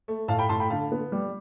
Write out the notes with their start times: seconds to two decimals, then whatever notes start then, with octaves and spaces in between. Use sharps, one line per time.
0.08 A3
0.28 A2 F5 A5
0.39 G5 B5
0.49 A2 A5 C6
0.60 G5 B5
0.70 D3 F5 A5
0.92 B3
1.12 G3